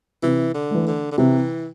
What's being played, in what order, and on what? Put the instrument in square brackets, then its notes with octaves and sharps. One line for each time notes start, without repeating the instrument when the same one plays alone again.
[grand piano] C3 [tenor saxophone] E3
[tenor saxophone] D3
[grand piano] E3 A3
[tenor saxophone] D3
D3
[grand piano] C3 [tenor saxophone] E3